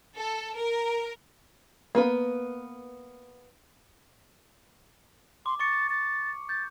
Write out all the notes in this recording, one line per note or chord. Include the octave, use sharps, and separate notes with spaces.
A4
A#4
A#3 B3 B4
C6 D6
C#6 D6 A6 C#7
A6
G6 A6